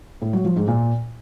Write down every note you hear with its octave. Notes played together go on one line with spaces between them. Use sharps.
A2
F#3
F3
G#2
A#2